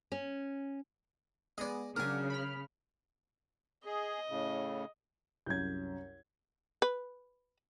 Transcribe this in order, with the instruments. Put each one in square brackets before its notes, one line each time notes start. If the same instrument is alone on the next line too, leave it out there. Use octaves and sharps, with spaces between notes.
[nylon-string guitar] C#4
[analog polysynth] G#3 B3 G#4 [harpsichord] D5 D#5
[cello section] C#3 [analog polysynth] F#3 D4 [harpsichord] A#4 G#5
[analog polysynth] B5 F6
[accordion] G#4 [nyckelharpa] D#5
[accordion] A2 C#3
[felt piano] C2 F#2 [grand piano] G6 G#6
[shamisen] B4